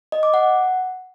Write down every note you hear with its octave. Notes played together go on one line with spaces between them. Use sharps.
D#5
D6
F#5